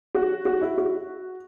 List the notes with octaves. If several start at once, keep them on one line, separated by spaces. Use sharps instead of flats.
F#4
F#4
E4
F#4